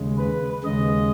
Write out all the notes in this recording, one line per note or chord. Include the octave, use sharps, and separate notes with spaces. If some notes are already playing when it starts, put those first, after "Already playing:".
Already playing: D#2 C#3 G#3
B4
D#2 C#3 G#3 D#5